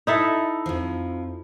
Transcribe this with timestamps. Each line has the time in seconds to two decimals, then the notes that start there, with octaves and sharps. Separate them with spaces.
0.07 D#4 E4 A4
0.66 F2 F3